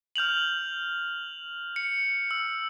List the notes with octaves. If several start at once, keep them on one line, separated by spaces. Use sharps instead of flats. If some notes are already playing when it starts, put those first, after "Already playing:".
F6 G6 F7 F#7
C#7
E6